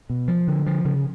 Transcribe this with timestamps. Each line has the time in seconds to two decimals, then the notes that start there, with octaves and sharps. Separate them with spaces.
0.10 B2
0.28 F3
0.48 D3
0.66 F3
0.85 C#3